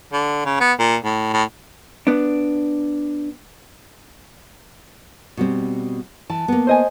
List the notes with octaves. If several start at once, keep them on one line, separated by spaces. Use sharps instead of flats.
D3
C#3
B3
A#2
A2
A2
B3 D4
B2 G3 C4
E3 A5
A#3 B3
C5 D#5 G#5